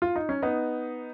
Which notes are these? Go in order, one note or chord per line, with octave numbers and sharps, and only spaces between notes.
F4
D#4
C#4
B3 D#4